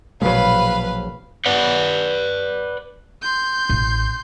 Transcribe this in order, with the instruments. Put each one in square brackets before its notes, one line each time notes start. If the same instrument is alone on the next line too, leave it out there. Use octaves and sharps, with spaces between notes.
[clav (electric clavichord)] A#1 F#3 [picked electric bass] B2 G#3 [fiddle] B4 [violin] F5 B5
[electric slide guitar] B4 D5 F#5
[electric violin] C6 G6
[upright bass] A1